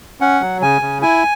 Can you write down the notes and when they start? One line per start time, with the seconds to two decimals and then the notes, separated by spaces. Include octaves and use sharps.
0.21 C#4 F#5
0.41 F#3
0.62 C#3 G#5
0.82 C#3
1.02 E4 G#5